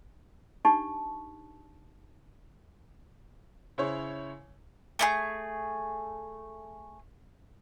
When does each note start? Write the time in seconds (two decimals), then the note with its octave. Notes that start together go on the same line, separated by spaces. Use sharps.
0.65 D4 D#4 G4 A5 C#6
3.78 C#3 E4 C5 C#5 C#6
4.99 A3 E4 G#4